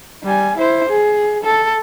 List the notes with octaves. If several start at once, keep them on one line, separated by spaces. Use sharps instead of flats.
G3 G#5
E4 C5
G#4
A4